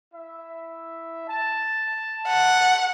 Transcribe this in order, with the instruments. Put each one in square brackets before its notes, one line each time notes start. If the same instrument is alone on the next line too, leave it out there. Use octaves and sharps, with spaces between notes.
[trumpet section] E4 E5
A5
[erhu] F#5